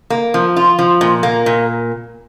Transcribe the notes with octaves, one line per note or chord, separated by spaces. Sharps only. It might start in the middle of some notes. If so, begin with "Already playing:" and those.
A#3
F3
F4
F3
A#2
A#3
A#2